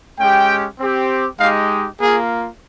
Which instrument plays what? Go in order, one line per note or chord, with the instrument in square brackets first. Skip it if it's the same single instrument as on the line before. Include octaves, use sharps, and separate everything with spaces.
[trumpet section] G#3 C#4 G4 G5
C4 G4
G#3 D#4 G4 F5
A#3 F4 G#4